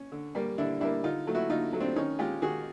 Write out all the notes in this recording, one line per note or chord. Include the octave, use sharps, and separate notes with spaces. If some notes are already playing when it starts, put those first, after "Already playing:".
Already playing: C#4
D3
G3 A#3
D3 D4 E4
G3 A#3 D4 E4
D3 D#4 F4
F#3 A3
E4 F#4
D3 D#4 F4
F#3 A3
C4 D4
D#3 C#4 D#4
G#3 F4 G4
D#3 F#4 G#4